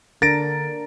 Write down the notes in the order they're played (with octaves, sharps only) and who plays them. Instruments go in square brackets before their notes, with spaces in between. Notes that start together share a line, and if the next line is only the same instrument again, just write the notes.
[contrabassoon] D3 [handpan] D4 A#4 [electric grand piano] A6 A#6 D7